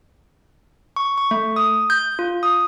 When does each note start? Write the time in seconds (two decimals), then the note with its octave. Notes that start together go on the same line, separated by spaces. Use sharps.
0.96 C#6
1.18 C#6
1.31 A3
1.56 D#6
1.90 G6
2.19 F4
2.43 D#6